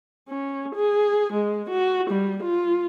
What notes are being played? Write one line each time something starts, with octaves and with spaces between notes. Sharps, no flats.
C#4
G#4
G#3
F#4
G3
F4